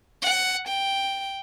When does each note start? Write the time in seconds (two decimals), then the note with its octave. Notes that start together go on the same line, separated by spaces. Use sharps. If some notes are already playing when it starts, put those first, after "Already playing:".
0.23 F#5
0.68 G5